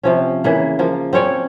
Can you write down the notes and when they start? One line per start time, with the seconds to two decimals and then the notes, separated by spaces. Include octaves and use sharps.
0.03 C3 F3 C#4
0.44 C#3 E3 A#3
0.79 F3 A#3
1.13 C4 C#4 C#5 D5